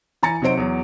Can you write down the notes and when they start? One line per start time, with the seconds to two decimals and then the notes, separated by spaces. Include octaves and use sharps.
0.23 E3 G#5 A#5 A6 C#7
0.42 C3 F#3 D#4 C5 D7
0.57 E2 F#3